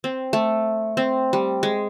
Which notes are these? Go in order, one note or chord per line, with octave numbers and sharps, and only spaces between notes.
C4
A3
C4
G3
G#3